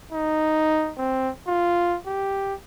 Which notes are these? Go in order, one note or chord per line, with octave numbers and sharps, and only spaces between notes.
D#4
C4
F4
G4